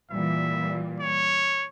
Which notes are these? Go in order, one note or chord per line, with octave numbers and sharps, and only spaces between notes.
A#2 E3 G3 E5
C#5